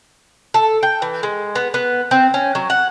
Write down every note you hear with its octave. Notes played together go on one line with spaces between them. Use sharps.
A4
G5
E3
G#3
B3
B3
C4
C#4
F#3
F#5